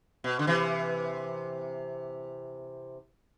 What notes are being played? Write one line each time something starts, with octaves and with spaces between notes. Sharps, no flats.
B2
D3
C3 E3